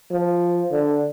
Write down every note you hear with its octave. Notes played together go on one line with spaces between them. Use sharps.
F3
D3